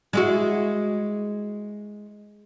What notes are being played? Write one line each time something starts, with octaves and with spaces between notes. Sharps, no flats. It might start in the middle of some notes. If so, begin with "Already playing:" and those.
G#3 E4 F#4